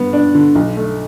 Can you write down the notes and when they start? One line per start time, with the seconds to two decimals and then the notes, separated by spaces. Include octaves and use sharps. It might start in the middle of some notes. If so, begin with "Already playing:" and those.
Already playing: G2 B3
0.13 D4
0.34 D3
0.55 B1
0.77 A3